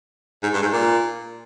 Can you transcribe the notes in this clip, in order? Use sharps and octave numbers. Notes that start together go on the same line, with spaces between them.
G#2
G2
G#2
A#2